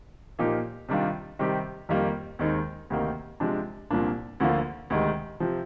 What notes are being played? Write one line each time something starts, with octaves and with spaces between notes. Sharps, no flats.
A#2 F3 A#3 D#4 G4
C3 D#3 G3 D4 F4
C3 D#3 G3 C4 G4
F2 D#3 G3 A#3 F4
D#2 D#3 G#3 C4 D#4
D2 C3 D#3 A#3
C3 F3 G#3 D4
C2 A#2 F3 A#3 D4
D2 D3 F3 A#3 F4
D2 C3 D#3 G#3
C3 F3